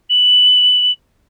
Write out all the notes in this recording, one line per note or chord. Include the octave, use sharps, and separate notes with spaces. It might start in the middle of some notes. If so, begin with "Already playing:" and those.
F#7